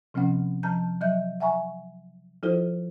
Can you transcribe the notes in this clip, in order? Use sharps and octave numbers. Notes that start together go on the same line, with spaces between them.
C3 F3 C4 C#4 F#5
F3 A5 A#5 G6
F#3 D#5 E5 G6
E5 F#5 G#5 A#5 C#6
F3 E4 F4 A4 C5